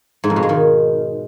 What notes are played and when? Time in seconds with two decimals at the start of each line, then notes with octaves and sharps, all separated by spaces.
0.24 G#2
0.30 F2
0.36 B2
0.43 G#3
0.49 D#3